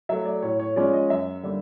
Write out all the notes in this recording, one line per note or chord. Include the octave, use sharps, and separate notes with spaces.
F#3 A3 E5
D5
A2 C#5
C#5
F3 G#3 C#4 D5
D#5
F#2 E5
D3 G3 A#3